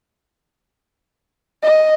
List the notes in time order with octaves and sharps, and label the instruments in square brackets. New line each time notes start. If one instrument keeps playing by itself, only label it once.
[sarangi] D#5